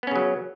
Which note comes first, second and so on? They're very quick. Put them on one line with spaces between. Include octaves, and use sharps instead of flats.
B3 C#4 C#3 F#3